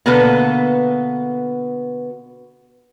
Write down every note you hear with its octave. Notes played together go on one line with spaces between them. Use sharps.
B2 D3 A#3 B3 A4 B4